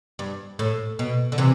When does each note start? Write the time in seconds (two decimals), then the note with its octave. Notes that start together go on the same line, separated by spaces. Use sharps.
0.19 G2
0.59 A2
0.99 B2
1.32 D3
1.38 C3 E3